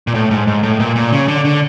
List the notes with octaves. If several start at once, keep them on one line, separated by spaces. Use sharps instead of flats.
A#2
A2
G#2
G#2
A2
A#2
A#2
C#3
D3
D3